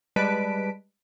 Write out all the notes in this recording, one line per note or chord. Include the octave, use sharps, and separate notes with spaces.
G3 G#3 B4 A5 B6 D7